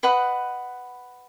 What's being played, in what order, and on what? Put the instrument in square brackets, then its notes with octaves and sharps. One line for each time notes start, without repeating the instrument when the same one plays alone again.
[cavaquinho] B4 D#5 F#5 B5